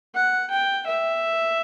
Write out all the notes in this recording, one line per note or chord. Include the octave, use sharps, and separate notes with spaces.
F#5
G5
E5